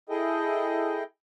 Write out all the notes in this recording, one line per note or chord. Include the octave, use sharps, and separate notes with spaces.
E4 G#4 A4 D#5 G5